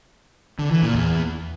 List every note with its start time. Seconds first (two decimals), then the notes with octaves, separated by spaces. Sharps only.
0.59 D3
0.71 E3
0.83 A#2
0.95 E2